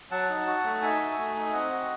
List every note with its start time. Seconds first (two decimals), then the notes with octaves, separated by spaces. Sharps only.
0.11 F#3 F#5 A5
0.30 D#4
0.47 F#4
0.64 A3
0.82 D#4 E5 G#5
1.00 F#4
1.18 A3
1.36 D#4
1.46 E5
1.53 C4 D#5 F#5
1.71 F#4